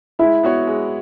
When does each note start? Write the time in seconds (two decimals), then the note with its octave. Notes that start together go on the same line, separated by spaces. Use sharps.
0.19 G#3 E4
0.43 B3 F#4 C#5
0.67 G#3